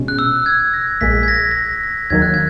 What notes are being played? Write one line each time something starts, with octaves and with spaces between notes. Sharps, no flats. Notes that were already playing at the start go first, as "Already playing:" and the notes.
Already playing: B2 G#3 C#4
F#6
E6
G#6
A#6
A#1 A#2 G#3 B6
G#6
A#6
A#6
G#6
A#6
D#2 D#3 F#3 A#3 G#6
F#6
G#6